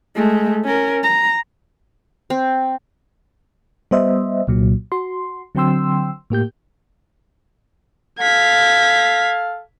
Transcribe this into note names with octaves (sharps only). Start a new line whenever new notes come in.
G#3 A3
C#4 A#4
A#5
C4
G3 B3 C5 D#5 E5
C2 A#2 F#3
F#4 C6
D3 F#3 C4 G5 C6 E6
A2 A#3 G4 G6
A4 F5 G#6 B6